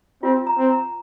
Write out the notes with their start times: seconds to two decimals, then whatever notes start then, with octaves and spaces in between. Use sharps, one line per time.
0.23 C4 F4
0.47 A#5
0.58 C4
0.70 A#5